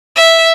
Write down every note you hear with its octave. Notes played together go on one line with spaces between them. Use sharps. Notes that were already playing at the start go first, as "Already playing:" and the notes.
E5